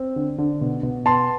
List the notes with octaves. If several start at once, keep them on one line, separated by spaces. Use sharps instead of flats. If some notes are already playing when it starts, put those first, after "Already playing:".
Already playing: C4
D3
D3
B2
B2
B3 A5 C6